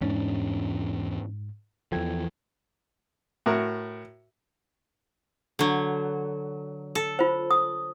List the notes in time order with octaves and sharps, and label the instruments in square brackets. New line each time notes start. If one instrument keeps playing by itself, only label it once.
[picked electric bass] E2 C#4 D4 [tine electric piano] G#2
[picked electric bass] E2 E3 F3 [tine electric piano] A4 G5 G#6
[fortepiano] A2 F#4 A#4
[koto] D3 F#3
A4
[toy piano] F4 C5
D#6